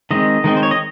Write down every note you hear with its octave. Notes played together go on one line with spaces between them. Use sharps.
D#3 G#3 C4 D#5
D#3 G#3 C4
C5
C#5
D#5